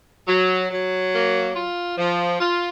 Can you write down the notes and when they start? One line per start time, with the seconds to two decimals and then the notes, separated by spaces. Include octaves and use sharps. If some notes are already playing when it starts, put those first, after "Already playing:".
0.28 F#3
0.70 F#3
1.13 A#3
1.55 F4
1.97 F3
2.40 F4